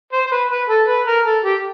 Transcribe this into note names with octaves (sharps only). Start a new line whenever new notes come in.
C5
C5
B4
B4
A4
B4
A#4
A4
G4